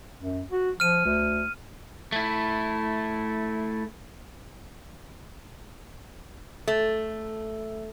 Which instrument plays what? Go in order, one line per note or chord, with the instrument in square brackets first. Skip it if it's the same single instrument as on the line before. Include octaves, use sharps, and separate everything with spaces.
[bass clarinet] F#2
F#4
[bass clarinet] F3 [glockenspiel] F6 D#7
[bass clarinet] D2
[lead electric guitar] A3 E4
[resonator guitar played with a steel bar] A3